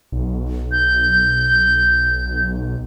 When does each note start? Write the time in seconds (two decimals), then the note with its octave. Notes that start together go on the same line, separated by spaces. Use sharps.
0.12 B1
0.72 G6